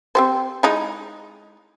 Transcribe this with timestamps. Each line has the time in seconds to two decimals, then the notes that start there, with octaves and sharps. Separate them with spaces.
0.15 C4 G4 C5
0.63 G#3 D#4 E4